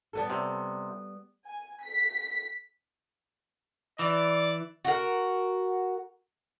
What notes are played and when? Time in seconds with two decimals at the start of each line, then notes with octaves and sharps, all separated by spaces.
0.13 G3 B3 A4
0.30 C3
1.46 G#5
1.83 B6
3.99 E3 D5
4.85 F#4 A#4